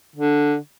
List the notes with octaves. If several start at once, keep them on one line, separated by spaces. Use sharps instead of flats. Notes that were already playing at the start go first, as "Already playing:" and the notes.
D3